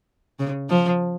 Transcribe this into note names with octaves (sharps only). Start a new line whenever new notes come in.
C#3
F3